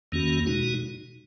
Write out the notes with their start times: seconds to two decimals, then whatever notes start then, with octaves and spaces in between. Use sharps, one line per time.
0.12 E2 D#3 A#3 C#4 F#4
0.46 B2 G#3 D#4 F#4